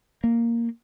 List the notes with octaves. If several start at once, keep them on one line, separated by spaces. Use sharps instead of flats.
A#3